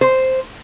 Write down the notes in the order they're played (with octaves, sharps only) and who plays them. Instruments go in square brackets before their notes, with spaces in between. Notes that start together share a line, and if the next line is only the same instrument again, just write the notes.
[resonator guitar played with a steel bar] C5